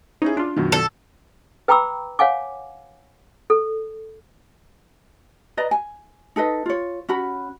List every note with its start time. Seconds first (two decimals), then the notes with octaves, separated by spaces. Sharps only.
0.22 C#4 D#4 E4 G#4
0.37 D4 F4 C6
0.56 F#2 B2 D#3
0.72 A4
1.68 B4 G5 A#5 B5 D6 E6
2.19 C#5 F5 F#5 G#5 D6
3.50 A4
5.57 B4 D5 D#5 A#5
5.71 G#5
6.36 D#4 A4 B4 D#5
6.66 F4 C#5
7.09 C#4 F#4 B5